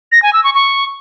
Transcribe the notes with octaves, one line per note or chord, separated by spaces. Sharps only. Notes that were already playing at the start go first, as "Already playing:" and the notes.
A#6
G#5
E6
C#6
C#6